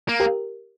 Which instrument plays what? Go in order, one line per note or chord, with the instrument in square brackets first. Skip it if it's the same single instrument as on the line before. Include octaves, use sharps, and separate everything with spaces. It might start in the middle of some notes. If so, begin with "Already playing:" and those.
[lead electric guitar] A#3
[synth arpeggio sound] G4 A#4